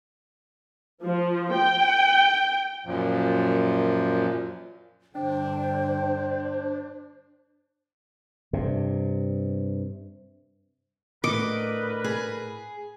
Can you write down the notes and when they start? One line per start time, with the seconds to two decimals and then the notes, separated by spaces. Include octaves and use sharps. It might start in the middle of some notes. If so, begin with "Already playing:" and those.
1.04 F3
1.57 G5
2.85 F#2 A#2 F3
5.15 G2 D3 D4 C5 G5
8.53 G2 C3
11.24 A2 D3 A#4 B4 D#5 D6
12.04 G#4